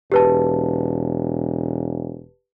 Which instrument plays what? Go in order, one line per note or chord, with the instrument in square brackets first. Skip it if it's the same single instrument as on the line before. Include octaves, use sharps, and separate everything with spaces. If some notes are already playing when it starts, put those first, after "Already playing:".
[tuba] E1 [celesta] G4 B4 A5